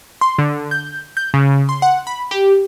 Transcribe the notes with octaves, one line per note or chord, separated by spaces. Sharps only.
C6
D3
G6
G6
C#3
C6
F#5
B5
G4